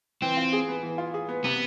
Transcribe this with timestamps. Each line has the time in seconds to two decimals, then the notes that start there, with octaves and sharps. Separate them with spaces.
0.22 E3 C4
0.37 F4
0.53 G#4
0.68 B3
0.83 E3
0.98 F4
1.14 G#4
1.29 B3
1.44 C3 B3